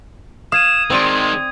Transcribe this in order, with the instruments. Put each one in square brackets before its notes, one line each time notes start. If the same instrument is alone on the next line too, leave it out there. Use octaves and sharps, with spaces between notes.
[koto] F5 [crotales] D#6 G#6 D#7 [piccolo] E7
[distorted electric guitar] D#3 G#3 [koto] C4 D5 G5 [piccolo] C6